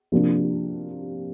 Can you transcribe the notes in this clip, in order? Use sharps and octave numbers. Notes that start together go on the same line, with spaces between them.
C3 F3 A#3 D4 F4